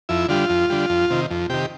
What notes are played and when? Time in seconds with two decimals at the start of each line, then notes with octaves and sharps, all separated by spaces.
0.09 F2 E4
0.29 D3 G3 F4
0.50 F2
0.70 D3 G3
0.90 F2
1.10 C3 D#3
1.30 F2
1.50 C3 D#3 G4